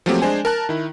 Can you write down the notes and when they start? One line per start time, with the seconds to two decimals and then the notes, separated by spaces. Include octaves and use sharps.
0.06 F3 F#3 A3 A#3 C4 G4
0.22 G#3 D4 C5 G#5
0.45 A#4 A5 F#6
0.69 D#3 E4